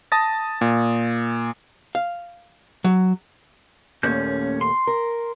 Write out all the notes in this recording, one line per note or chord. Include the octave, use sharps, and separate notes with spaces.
A5 D#6 A6 A#6
A#2
F5
F#3
D#2 A#2 A3 C#4 G6
C6
A#4